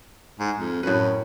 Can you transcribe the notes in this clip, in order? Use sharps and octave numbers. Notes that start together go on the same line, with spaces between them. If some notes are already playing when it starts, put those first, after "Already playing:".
G#2
F2
F#2 A2 B4